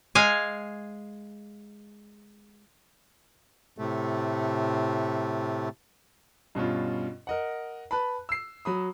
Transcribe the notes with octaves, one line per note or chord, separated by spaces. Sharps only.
G#3 F5 G#5
A2 C3 A3
G2 B2 C#4 F4
A#4 D#5 F#5
B4 A5 B5
E6 C7
F#3 B5 D#6